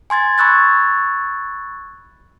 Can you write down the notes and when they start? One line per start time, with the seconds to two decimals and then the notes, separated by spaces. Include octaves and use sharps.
0.10 G#5 C6 G#6 A6
0.38 B5 C#6 E6 F#6 G#6 A6